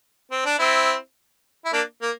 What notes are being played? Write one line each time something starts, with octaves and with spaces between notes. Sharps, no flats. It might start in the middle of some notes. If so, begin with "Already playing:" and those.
C4
D4
C4 E4
E4
A#3 D4
A#3